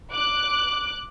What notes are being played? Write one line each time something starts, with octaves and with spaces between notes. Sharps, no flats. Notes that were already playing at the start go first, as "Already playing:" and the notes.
D6 F#6